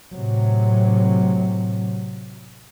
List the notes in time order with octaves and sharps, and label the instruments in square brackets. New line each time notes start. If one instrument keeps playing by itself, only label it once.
[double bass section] A2 C3 F#3